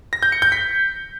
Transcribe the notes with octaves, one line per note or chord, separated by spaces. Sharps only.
A#6
G6
C#7
G6
B6